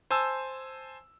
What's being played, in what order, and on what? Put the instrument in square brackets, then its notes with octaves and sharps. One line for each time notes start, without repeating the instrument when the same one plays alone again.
[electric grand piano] C5 G#5 A5 E6